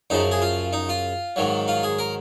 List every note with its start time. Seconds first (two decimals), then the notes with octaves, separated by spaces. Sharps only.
0.10 F#2 C#3 F3 D#4
0.31 G#4
0.42 F4
0.73 D#4
0.89 F4
1.36 G#2 D#3 F#3
1.68 F4
1.83 G#4
1.99 A#4